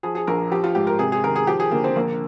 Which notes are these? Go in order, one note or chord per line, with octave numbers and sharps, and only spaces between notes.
F3 G#4
G#4
A#1 A#4
F3 G4
F4
G#2 G4
A#4
C3 G#4
G#4
D#3 A#4
G#4
F3 G4
G#4
D3 A#3
C4
A#1 A#3